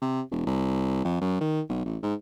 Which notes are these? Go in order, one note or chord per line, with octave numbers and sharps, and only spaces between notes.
C3
E1
C2
F2
F#2
D#3
B1
A1
G#2